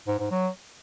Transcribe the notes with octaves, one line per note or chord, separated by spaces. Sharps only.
G#2
G#2
F#3